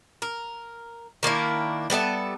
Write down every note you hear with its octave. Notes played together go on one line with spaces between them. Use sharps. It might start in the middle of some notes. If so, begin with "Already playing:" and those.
A#4
D#3 A#3 D4 E4
G3 B3 A4 E5